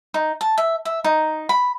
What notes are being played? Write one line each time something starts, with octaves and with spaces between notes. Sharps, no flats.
D#4
A5
E5
E5
D#4
B5